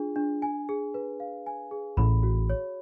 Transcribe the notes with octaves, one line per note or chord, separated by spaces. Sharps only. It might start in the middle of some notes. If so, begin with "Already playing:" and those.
Already playing: D4 F4 G#4
D4
G#5
G#4
B4
F5
G#5
G#4
A1 A2 B5
F#4
C#5